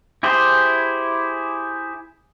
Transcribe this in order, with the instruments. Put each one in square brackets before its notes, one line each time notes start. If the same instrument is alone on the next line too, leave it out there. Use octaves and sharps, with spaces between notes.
[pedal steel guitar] E4 G4 G#4 C5